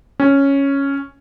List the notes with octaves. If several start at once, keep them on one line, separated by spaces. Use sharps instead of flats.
C#4